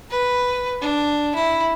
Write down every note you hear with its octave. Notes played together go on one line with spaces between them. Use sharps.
B4
D4
E4